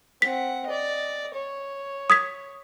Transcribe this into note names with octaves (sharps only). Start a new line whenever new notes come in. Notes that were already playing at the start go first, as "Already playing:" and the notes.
C4 F#5 B6
D5 D#5
C#5
D#6 G#6 B6